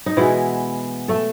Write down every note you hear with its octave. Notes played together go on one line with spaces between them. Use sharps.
D#4
B2 E3 G#3 B3 E4
A3 A4